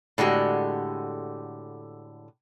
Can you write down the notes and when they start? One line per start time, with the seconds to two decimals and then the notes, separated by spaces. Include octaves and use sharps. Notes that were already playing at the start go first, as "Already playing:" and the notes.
0.18 A2 D3 G#3 F#4 G4